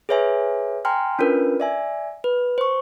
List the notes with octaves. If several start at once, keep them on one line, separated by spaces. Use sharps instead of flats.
G#4 B4 C#5 E5 G#5
G5 G#5 A#5 C6 F6
C#4 D4 F4 A#4 B4
D5 E5 G#5
B4
C5 C#6